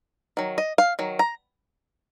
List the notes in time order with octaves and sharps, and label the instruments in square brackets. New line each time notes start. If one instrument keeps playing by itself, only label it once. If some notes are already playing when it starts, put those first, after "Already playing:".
[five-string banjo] D#3 F#3
D#5
F5
D#3 F#3
A#5